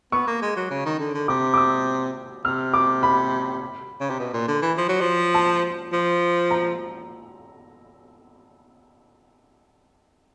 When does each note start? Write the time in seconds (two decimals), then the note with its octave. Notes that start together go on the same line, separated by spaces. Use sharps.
0.12 B3 C#6
0.27 A#3
0.42 G#3
0.56 F#3
0.70 C#3
0.85 D#3
0.99 D3
1.14 D3
1.28 C3 D6
1.54 D6
1.57 D#6
2.45 C3 F6
2.74 D6
3.03 B5
4.00 C#3
4.10 C3
4.19 B2
4.33 A#2
4.48 D3
4.62 E3
4.78 F3
4.89 F#3
5.01 F3
5.34 A5
5.92 F3
6.51 A#5